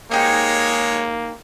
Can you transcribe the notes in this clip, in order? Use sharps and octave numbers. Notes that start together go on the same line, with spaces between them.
G#3 A#3 D#4 G4 G#4 C5 C#5